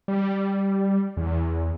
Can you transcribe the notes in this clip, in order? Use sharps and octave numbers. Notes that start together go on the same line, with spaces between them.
G3
E2